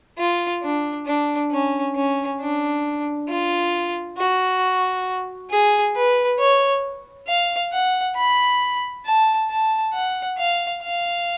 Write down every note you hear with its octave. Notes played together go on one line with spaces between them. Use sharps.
F4
D4
D4
C#4
C#4
D4
F4
F#4
G#4
B4
C#5
F5
F#5
B5
A5
A5
F#5
F5
F5